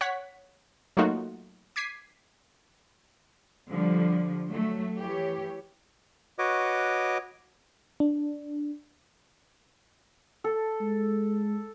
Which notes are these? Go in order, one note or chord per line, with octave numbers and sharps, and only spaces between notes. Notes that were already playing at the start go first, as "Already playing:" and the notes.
C#5 F#5 B6
F#3 A3 A#3 D#4 F4 F#4
D6 G#6 B6 C7 D#7
D3 F3 G3
F#3 A3
E3 G4 C#5
F#4 B4 C#5 D#5 D6
D4
A4
G#3